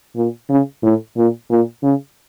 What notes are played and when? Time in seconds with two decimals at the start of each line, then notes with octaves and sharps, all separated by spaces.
0.16 A#2
0.49 C#3
0.83 A2
1.17 A#2
1.50 A#2
1.83 C#3